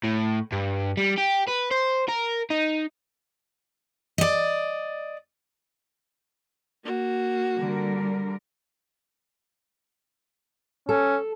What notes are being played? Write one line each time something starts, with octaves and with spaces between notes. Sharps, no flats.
A2
G2
G3
G4
B4
C5
A#4
D#4
D5 D#5
A#3 F#4
D3 G3 A#4
C#4 A4